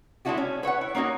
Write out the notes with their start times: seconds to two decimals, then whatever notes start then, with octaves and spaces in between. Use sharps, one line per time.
0.25 G#3 B3 D4 E4 F#4 G4
0.37 C#4
0.63 B4 C#5 E5 F#5
0.81 E4
0.95 A#3 C#4 D#4 F#4